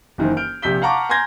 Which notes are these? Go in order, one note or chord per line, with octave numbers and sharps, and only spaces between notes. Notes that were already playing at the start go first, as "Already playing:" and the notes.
F#1 D#3 E3 C5
F6 G6 D7
A#1 C3 G6 B6 G7
F5 F#5 A5 A#5 C#6 D6
G#5 A#5 C6 G6 G#6 A#6